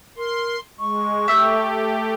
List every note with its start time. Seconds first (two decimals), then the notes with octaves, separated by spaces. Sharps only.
0.17 A#4 C6
0.80 G#3 C#6
1.28 A3 G4 E5 E6 G6